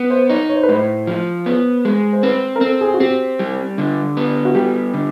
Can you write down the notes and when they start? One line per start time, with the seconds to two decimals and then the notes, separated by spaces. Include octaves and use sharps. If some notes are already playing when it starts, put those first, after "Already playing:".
Already playing: B3
0.10 C5
0.30 D#4 C#5
0.49 C#5
0.56 C5
0.63 B4
0.69 A2 C5
1.07 F3
1.46 B3
1.85 G#3
2.13 C5
2.23 C4 B4
2.56 A#4
2.61 C4 A4
2.81 G#4
2.94 F#4
3.00 C4 G4
3.39 G3
3.78 D3
4.17 B3
4.45 F#4
4.55 G3 G4
4.94 D3